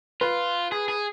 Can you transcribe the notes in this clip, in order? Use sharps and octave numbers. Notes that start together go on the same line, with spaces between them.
F4 B4
G#4
G#4